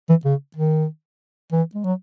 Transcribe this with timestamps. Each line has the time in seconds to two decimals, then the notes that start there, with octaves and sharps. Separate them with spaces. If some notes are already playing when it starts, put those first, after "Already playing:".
0.09 E3
0.24 C#3
0.57 D#3
1.52 E3
1.75 G#3
1.84 F#3